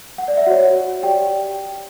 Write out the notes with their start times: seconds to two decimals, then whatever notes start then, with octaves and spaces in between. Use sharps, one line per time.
0.18 F#5
0.28 D5
0.37 E5
0.46 F#4 C#5 F#5
1.03 G4 D5 G5